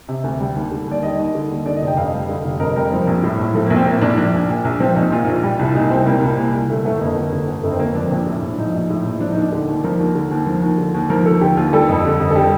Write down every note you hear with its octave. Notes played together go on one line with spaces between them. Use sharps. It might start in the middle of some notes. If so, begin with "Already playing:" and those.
C3
D2
G3
D#2
D3
D#2 D5
G3 D#5
D#2
D3
D#2
D3 D5
D#5
F1
G5
F2 F5
G3
D3
F1
F2 A#4
G3 A#4
F3 C4
A#1
A2
A#1
F3 A3
A#3
A#1
C4
A2 A#3
A#1 D4
F3 D4
A#1
A#2
A#1
F3 C4
A#1 D#4
A#2 F4
A#1
G3
C2
F4
A#2 D#4
C2 C4
G3 A#3
C2
A#2
C2
D3 A3
G1 A3
F2 A#3
G1
D3
G1
F2 A3
C4
G1 A#3
F3 D4
A#1 C4
D4
A2
A#1
F3 D#4
A#1
A2
A#1
F3 D4
D#4
D#2
D4
D3
D#2
F3 A#4
D#2
D3
D#2
F3
D#2
D3
D#2
F3 A#4
D#2 A4
D3 G4
D#2 F4
G3 A4
F2
D3
F2
A4
G3 G4